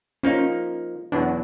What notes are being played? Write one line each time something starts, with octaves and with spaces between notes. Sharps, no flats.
F3 A#3 C#4 D#4
E2 B2 F#3 D4